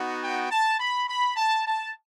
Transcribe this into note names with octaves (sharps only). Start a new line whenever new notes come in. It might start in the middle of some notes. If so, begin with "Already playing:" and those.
Already playing: B3 D#4 F#4
G5
A5
B5
B5
A5
A5